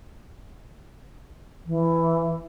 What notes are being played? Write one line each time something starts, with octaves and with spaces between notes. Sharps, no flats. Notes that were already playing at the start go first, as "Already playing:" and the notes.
E3